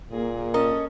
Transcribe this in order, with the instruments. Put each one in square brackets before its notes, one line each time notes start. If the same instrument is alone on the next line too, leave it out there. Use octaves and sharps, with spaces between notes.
[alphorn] A#2 [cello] A#3 G#4
[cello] C#4 [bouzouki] A4 D#5 [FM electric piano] A#4